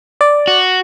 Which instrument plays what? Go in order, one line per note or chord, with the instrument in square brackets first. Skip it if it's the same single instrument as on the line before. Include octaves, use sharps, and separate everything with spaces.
[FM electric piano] D5
[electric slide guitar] F#4